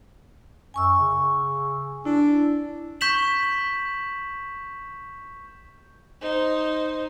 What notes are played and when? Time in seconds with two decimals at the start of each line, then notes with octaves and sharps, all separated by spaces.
0.74 F#2 G#5 C#6 E6
1.00 C#3
2.05 D4 E4
3.01 C#6 G6 B6 E7 F#7
6.21 D#4 C5